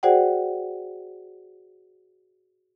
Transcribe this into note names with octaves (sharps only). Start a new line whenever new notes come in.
F#4 G#4 C5 D5 F#5 G5